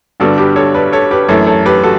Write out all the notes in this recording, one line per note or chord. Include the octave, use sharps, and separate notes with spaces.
G2 D3 G3 B3 F#4 A4
G4 B4
A4 C#5
B4 D5
A4 C#5
G4 B4
F#2 E3 A3 A4 C#5
A4 C#5
G4 B4
F#4 A4